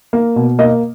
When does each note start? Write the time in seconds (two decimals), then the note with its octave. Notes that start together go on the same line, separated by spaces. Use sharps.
0.13 A#3
0.36 B2
0.59 A#3 D#5